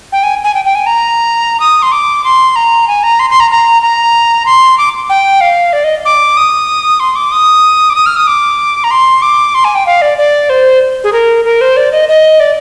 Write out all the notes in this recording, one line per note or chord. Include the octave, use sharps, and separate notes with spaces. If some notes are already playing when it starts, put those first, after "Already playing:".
G5
G#5
G#5
G5
G5
G#5
A#5
D#6
C6
D6
C6
A#5
G#5
A#5
C6
C6
A#5
A#5
A#5
C6
D6
G5
F5
D5
D#5
D6
D#6
C6
D6
D#6
D6
D#6
F6
D#6
D6
A#5
C6
D6
C6
G#5
G5
F5
D5
D5
C5
G#4
A#4
A#4
C5
D5
D#5
D#5
D5